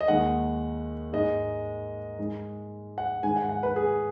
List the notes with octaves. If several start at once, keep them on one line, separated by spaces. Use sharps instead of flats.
D#5
D#2 D#3 G#3 F#5
G#2 G#3 D#5
G#2 G#3
F#5
G#2 D#3 G#3 G#5
F#5
F#5
B4
G#4